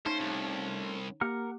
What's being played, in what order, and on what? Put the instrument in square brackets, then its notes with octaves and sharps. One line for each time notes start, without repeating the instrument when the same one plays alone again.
[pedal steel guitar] A3 C#4 F4 [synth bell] D#4 [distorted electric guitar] C5
[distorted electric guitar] C2
[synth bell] A#3 G4 [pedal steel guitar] A#4 F#5 F6